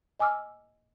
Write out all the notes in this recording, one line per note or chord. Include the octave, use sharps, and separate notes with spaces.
D#5 G#5 D6 E6 F6